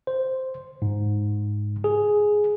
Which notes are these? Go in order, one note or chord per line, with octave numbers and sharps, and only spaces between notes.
C5
G#2
G#4